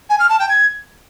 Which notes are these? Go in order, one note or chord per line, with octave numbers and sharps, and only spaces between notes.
G#5
F6
A5
G5
G#6